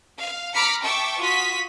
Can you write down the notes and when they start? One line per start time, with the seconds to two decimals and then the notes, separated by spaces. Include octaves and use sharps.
0.17 F5
0.54 A#5 B5 D6 F6 B6 C#7
0.83 E5 G5 A5 C#6 D6 E6
1.18 F4 F#4 D#6 B6